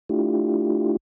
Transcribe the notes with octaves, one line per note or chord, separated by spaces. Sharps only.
A3 D4 E4 F4 G4